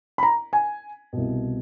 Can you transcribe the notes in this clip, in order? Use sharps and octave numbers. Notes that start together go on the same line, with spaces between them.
B5
A#5
G#5
C2 B2